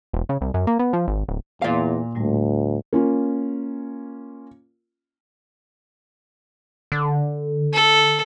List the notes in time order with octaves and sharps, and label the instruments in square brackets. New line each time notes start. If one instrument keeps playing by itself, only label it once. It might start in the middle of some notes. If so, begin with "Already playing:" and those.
[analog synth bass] E1
C#3
C2
F#2
A#3
B3
F3
G#1
D1
[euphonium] E2 [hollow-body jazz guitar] A#2 F5
[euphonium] D2 [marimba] A2 G3 A3
[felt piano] A#3 C#4 F4
[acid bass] D3
[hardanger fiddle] A4